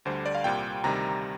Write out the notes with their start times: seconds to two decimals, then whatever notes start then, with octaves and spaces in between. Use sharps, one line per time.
0.05 D2 D3 G3 C5
0.26 D5
0.35 F5
0.44 C2 A#2 G3 G5
0.84 D2 C3 D#3 G3 A#5